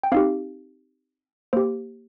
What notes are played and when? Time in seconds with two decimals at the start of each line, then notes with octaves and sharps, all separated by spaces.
0.03 G5
0.12 C4 D#4 G4 F5
1.53 A#3 G4 C5